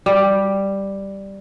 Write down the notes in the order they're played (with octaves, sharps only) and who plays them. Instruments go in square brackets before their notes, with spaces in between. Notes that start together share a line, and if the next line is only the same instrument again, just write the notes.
[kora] G3